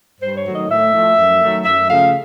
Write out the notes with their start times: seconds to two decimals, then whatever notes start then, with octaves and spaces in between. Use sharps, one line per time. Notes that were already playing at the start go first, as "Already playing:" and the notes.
0.21 G2 C5
0.37 C#5
0.45 D#3 F#3 A3
0.53 D#5
0.69 A2 E5
0.93 F3 A3
1.17 F#2
1.41 D#3 F#3 A3
1.65 F#2 E5
1.89 C#3 F3 A3 F5